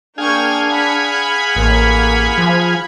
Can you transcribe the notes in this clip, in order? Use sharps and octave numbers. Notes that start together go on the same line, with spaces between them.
A#3 D4 G#4 F5 G5 G#5 C#6
F#5 B5 C#7
A1 A#3
F3